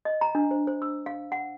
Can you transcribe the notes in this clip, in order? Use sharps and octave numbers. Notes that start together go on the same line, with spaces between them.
D#5
A#5
D4
C5
C5
E6
F5
F#5